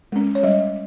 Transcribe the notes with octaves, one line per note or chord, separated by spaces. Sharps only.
G#3 C#4
C#5
G3 D#5